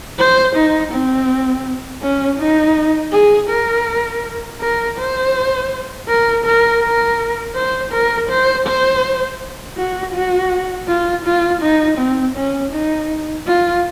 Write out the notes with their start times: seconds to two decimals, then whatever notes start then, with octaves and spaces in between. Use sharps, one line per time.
0.19 C5
0.56 D#4
0.92 C4
2.02 C#4
2.39 D#4
3.13 G#4
3.50 A#4
4.61 A#4
4.98 C5
6.08 A#4
6.45 A#4
6.83 A#4
7.55 C5
7.92 A#4
8.29 C5
8.67 C5
9.77 F#4
10.14 F#4
10.88 F4
11.25 F4
11.62 D#4
11.98 C4
12.35 C#4
12.71 D#4
13.46 F4